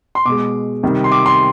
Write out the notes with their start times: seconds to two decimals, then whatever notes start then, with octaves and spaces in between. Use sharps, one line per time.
0.15 C6
0.25 B2 G#3 D6
0.83 C3 D#3 G3
1.04 C6
1.12 D6
1.26 C6